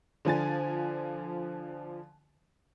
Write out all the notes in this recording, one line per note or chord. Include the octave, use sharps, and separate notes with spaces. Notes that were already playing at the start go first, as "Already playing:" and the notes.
D3 F3 G#5 A6